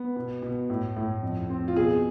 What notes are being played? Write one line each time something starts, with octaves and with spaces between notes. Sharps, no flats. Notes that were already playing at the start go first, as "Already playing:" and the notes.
Already playing: B3
B2
B2
A2
A2
F2
C4
F4
B2 G#4